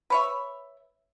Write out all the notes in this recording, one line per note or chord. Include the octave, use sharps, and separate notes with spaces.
B4 C#5 E5